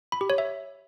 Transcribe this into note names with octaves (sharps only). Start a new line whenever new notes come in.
B5
G4
C#5
E5